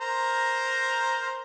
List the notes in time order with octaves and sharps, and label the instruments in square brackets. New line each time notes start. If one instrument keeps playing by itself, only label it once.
[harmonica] A#4 C5 A#5